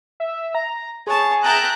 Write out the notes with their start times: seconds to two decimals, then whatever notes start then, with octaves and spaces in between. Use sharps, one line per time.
0.20 E5
0.55 A#5
1.07 G#4 C#5 A5
1.44 E5 G5 A5 A#5 F#6